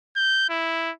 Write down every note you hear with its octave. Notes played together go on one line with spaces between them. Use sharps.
G6
E4